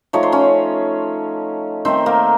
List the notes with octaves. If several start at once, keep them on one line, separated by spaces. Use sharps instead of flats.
F3 A3 D#4 C#5
C5
C#4 C#5
D#3 A3 C4 D#4 C5
A#3 A#4